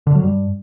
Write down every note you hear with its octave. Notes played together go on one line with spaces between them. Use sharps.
D3
F#3
G2